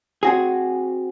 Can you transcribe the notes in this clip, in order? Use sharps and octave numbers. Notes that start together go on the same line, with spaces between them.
C4 F#4 G#4